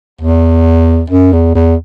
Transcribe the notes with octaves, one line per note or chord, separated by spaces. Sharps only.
E2
F#2
E2
E2